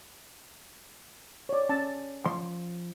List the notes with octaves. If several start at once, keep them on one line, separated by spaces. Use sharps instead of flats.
C#5 D5
C#4 A5
F3 C6